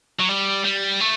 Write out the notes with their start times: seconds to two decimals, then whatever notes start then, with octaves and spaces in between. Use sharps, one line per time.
0.19 F#3
0.29 G3
0.65 G3
1.01 A3